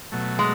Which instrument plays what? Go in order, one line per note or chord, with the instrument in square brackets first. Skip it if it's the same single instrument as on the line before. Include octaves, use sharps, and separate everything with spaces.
[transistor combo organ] B2 F#3 A3
[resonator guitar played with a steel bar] G#3